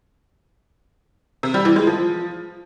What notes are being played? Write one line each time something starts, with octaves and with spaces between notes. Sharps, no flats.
C3
G3
E3
G#3
F3